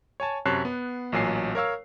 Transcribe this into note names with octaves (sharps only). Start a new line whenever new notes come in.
C#5 G#5 A5
F#2 C3 C#5 A5 F#6 C7
B3
A1 A#2 F#3 G#5 C7
A#4 C#5 F5 E6